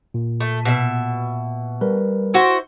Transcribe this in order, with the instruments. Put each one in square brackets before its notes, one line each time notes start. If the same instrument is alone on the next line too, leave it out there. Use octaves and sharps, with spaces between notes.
[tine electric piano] A#2
[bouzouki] A3
B2 E5
[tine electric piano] G3 A#4 B4
[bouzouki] E4 F#4 C5